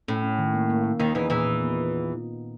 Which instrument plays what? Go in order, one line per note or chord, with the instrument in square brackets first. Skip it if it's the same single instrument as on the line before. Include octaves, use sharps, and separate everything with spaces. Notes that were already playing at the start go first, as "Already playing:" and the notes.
[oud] A2 [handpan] C#4
[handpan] C#4
D#3
A#3
A#3
A#3
[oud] D#2 D#3 [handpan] D#4
[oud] E2 E3 [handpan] D#4
[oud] E2 E3 [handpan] A#2
[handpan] A#2
B3